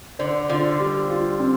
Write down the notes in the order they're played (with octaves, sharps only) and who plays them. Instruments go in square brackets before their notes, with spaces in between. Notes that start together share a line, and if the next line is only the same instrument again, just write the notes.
[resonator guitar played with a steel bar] D3 [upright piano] C5
[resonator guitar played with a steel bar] D3 [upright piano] F4
[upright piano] G3
F4
C4